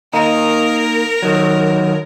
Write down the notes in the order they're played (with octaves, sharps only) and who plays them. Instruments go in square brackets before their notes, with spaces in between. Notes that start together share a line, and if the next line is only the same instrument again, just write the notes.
[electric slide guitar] A#3 D#4 [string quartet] A#4
[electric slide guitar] D#3 F#3